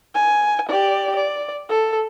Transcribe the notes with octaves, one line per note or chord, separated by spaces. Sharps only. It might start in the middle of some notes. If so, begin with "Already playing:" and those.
G#5
G4 D5
D5
A4